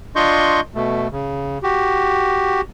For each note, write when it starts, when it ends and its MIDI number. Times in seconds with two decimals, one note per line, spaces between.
0.16 0.60 62
0.16 0.60 65
0.16 0.60 75
0.16 0.60 84
0.16 0.60 85
0.16 0.60 91
0.75 1.08 47
0.75 1.08 57
1.12 1.58 49
1.63 2.61 66
1.63 2.61 67